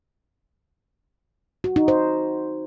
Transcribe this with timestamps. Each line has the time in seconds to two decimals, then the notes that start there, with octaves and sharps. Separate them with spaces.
1.64 F#4
1.76 D#4
1.88 C5